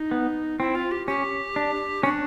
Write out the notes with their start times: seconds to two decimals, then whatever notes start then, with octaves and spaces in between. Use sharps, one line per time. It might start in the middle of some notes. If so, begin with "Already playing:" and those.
Already playing: D#4
0.11 B3
0.59 C4 E4
0.75 F4
0.91 G4
1.07 C#4 G4
1.56 D4
2.03 C#4 D4